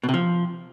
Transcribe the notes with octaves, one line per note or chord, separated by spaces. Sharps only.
B2
C3
F3